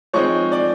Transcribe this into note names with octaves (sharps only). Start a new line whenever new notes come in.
F3 G#3 C4 D#4 C#5 C#6
D5 D6